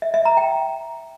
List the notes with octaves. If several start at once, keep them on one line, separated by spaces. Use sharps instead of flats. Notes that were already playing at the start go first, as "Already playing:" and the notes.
E5
E5
A#5
G5